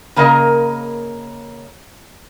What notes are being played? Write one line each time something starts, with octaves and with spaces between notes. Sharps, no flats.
C#3 A#3 A#4 D#5